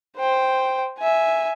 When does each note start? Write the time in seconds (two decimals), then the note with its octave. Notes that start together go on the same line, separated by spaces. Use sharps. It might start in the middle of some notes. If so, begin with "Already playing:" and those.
0.17 C5 G5
0.98 E5 G#5